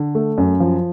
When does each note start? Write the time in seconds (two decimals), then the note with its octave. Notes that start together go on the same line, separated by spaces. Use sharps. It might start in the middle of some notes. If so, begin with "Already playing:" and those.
Already playing: D3
0.15 A3
0.38 F#2
0.60 F3